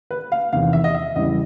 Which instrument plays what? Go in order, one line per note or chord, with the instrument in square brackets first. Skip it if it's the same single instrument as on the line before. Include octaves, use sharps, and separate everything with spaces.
[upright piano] B4
F5
[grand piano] E2 C3 D#3 [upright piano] F5
[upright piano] E5
D#5
E5
[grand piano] E2 C#3 E3 G3 [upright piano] D#5